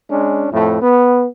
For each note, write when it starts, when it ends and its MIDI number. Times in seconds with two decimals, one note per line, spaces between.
0.10 0.47 56
0.10 0.47 61
0.10 0.47 62
0.52 0.80 41
0.52 0.80 45
0.52 0.80 57
0.82 1.25 59